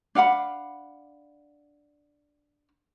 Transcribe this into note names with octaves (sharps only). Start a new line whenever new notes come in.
D4 F5 F#5 B5